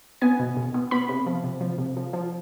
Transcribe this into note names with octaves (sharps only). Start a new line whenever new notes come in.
B3 G#5
B2
B2
B3
B3 B5
C3
F3
C3
F3
C3
F3
F3